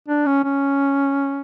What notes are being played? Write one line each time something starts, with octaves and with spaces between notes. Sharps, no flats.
D4
C#4
C#4